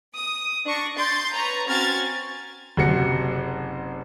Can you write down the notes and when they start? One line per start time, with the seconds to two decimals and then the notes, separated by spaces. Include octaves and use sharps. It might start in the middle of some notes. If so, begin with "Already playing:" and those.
0.14 D#6
0.65 D4 C#6 A#6
0.97 C6 G6 A6
1.33 B4 C#5 A#5
1.67 C4 C#4 F#4 F6 G#6 A6
2.77 F#1 C3 F#4 C#7